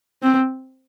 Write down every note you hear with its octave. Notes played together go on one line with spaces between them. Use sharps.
C4